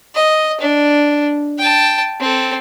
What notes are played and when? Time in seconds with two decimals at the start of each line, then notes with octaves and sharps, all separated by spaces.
0.15 D#5
0.61 D4
1.59 G5 A5
2.20 C4 A4